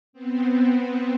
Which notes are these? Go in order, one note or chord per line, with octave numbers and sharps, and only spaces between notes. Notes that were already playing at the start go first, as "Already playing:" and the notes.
B3 C4